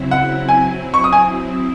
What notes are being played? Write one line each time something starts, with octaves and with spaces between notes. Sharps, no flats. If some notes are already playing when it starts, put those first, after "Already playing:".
Already playing: C#3 F#3 C4 E4
F#5
F#3 C4 E4 G#5
C#6
D#6
G#5